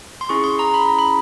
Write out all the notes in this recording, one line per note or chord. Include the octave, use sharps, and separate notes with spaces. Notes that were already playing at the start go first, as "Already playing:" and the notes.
C6
C#4 E4 G#4 C#6
C6
A#5
B5
A#5
B5